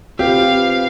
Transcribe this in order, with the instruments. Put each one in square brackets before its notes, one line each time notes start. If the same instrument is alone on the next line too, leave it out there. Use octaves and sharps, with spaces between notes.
[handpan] C4 F4 B4 [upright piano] G4 [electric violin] F5